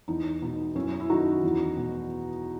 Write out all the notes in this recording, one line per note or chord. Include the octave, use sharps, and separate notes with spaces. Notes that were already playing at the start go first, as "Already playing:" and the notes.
E2 D#4
B2 D#4
F#2 C#4 E4
E4
D#3 D#4 F#4
E2
B2